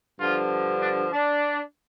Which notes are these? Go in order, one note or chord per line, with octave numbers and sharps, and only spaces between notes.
G2 D3 F3 F4
D4
D4